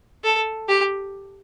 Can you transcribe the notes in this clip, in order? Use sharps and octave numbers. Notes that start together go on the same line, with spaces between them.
A4
G4